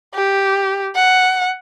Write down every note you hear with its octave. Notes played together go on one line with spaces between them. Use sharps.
G4
F#5